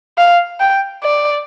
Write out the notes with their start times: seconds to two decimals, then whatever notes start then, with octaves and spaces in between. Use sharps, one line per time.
0.18 F5
0.60 G5
1.04 D5